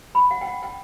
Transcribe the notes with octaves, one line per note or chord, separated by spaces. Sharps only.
B5
F#5
G5
F#5
G5